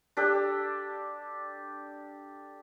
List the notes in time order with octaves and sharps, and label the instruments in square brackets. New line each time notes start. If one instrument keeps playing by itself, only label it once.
[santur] D4 G4 A4